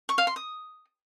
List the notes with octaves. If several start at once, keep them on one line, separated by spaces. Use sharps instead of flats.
C#6
F5
C6
D#6